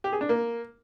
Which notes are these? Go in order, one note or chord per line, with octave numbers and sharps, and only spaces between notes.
G4
G#4
D4
A#3